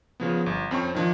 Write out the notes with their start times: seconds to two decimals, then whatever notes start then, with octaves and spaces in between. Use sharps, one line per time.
0.20 C#3 F3 B3
0.46 G1
0.71 F2 C4 C#4 C#6
0.95 D#3 F3 D4